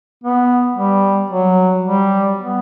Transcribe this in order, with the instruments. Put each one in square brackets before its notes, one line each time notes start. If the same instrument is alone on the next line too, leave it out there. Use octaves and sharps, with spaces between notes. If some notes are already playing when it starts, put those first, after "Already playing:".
[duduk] B3
G3
F#3
G3
B3